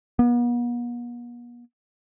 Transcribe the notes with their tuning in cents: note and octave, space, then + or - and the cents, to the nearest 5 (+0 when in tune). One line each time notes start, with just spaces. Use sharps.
B3 -45